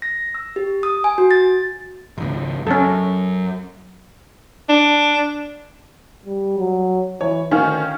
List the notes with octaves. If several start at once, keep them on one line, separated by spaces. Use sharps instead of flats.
A#6
E6
G4
D#6
G#5
F#4
A6
G#1 C#2
F#2 C#4 A4
D4
G3
F#3
E3 C#5
D2 D#3 C#4 F5